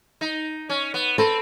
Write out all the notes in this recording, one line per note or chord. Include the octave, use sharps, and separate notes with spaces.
D#4
C#4
B3
C4 A4 B4